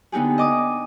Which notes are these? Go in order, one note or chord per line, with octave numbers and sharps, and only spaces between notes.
D3 B3 D#4 G4 G#4
D#5 D6 D#6